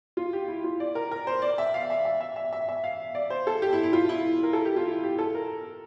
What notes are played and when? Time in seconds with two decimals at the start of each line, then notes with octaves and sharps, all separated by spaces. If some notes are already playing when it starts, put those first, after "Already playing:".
0.17 F4
0.33 G4
0.48 E4
0.64 F4
0.80 D5
0.95 A#4
1.11 A#4
1.27 C5
1.42 D5
1.58 E5
1.74 F5
1.90 E5
2.05 E5
2.21 E5
2.36 E5
2.53 E5
2.69 E5
2.84 F5
3.15 D5
3.30 C5
3.47 A4
3.62 G4
3.73 E4
3.83 E4
3.93 F4
4.09 E4
4.43 A#4
4.53 A4
4.65 G4
4.76 F4
4.88 E4
5.03 G4
5.19 A4
5.35 A#4